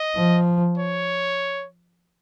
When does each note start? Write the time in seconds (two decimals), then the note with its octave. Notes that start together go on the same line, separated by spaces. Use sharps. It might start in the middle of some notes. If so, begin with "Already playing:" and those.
Already playing: D#5
0.15 F3
0.78 C#5